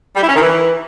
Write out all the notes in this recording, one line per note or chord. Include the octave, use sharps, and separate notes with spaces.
G3
E4
C#4
D#3
E3